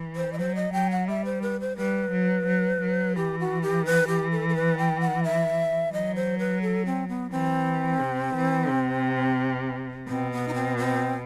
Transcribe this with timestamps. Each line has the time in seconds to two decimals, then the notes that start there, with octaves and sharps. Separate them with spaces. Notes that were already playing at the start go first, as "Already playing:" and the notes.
Already playing: E3
0.16 C5
0.33 D#5
0.38 F#3 C5
0.55 D#5
0.73 F#3 G5
0.91 F#5
1.08 G3 E5
1.25 C5
1.42 B4
1.60 C5
1.78 G3 B4
2.11 F#3
2.47 F#3
2.81 F#3
3.16 E3 G4
3.39 F#4
3.62 G4
3.85 B4
4.08 G4
4.31 A4
4.49 A4
4.55 B4
4.78 G5
5.01 F#5
5.23 E5
5.93 F#3 D#5
6.15 C5
6.39 B4
6.62 A4
6.86 C4
7.08 B3
7.31 E3 C4
8.00 C3
8.35 E3
8.70 C3
10.08 B2 C4
10.32 B3
10.48 D#4
10.54 C4
10.77 C4